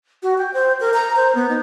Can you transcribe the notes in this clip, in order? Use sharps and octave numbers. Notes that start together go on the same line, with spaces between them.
F#4
G5
C5
A#4
A#5
C5
B3
D#4